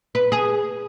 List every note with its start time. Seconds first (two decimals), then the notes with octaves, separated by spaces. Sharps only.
0.15 B4
0.32 G#4